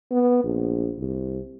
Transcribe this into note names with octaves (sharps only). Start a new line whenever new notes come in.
B3
A#1
C2